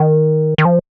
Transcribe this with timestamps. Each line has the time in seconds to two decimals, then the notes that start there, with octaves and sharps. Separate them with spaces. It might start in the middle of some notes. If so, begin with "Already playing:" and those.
Already playing: D#3
0.58 D#3
0.65 F3